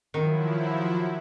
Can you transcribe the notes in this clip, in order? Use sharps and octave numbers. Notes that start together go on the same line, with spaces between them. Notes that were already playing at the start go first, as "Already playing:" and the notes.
D#3 F3 F#3 E4